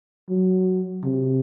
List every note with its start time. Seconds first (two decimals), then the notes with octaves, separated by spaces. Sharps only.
0.30 F#3
1.04 C3